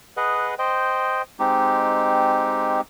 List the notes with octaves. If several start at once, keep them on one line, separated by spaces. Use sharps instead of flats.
G#4 B4 D#5 F#5
C5 D#5 G5
G#3 C4 D#4 G4